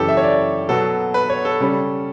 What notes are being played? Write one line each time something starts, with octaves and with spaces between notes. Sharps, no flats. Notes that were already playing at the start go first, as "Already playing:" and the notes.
Already playing: F#2 C#3 E3 G4 A4
E5
C#5
D5
B2 F#3 B3 A4
B4
C#5
A4
C#3 G3 C#4